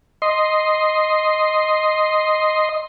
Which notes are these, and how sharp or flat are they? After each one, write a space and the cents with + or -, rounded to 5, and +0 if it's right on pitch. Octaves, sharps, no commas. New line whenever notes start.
D#5 +0 C6 +0